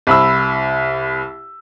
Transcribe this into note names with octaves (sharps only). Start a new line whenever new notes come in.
C2 B5 E6